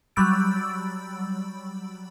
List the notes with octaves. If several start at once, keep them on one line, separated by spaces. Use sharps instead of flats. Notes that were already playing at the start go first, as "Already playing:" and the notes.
F#3 G3 B5 E6 A6 D7